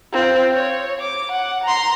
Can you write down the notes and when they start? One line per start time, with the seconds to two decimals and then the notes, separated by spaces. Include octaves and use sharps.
0.12 C4 F4
0.54 C#5
1.00 D6
1.31 F#5
1.64 A#5 C6